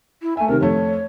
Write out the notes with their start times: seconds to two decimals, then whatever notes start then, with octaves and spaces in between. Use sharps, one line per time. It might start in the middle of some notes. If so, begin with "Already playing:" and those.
0.22 E4
0.37 A3 E5 G#5
0.48 C3 D#3 A#4
0.61 F2 A3 C#5